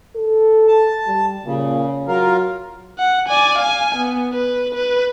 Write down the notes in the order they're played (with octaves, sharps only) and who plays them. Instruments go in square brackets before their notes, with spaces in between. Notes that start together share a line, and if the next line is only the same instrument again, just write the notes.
[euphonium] A4
[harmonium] A5
[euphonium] G3
[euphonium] A#2 [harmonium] C#3
[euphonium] F#3 [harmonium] F4 A#4 F5
[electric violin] F#5
D5 G#5
F5 G#5
B3
B4
B4